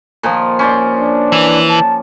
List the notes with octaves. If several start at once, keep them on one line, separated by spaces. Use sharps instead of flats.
A#2 D#3 F3
C#4 C5 D5
D4
E3
A5